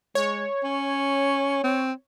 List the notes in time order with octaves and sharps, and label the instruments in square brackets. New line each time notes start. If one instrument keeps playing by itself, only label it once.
[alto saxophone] G#3 [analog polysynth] C#5
[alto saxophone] C#4
C4